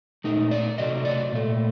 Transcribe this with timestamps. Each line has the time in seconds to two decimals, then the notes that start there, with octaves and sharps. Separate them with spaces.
0.24 A#2 A3 D#4
0.51 D5
0.78 C3 F#3 A3 D#5
1.05 D5
1.32 A#2 A3